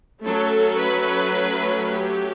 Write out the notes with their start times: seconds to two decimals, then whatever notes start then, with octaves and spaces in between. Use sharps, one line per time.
0.24 F#3 A3 C#4 A4
0.79 B4
1.90 G4